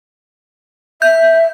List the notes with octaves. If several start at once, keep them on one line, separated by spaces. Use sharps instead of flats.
E5 G6